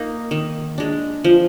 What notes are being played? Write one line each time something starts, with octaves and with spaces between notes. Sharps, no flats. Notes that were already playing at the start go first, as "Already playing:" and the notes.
Already playing: A#3 D#4
D#3
G#3 D4
F3